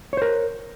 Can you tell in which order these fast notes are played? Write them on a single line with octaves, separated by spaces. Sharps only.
C#5 C5 A#4